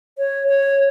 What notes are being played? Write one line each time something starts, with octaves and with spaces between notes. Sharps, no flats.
C#5
C#5